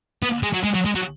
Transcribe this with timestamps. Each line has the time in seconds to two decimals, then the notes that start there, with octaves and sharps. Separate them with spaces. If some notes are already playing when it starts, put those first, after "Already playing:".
0.23 B3
0.43 G#3
0.53 F#3
0.64 G#3
0.74 F#3
0.85 G#3
0.95 F#3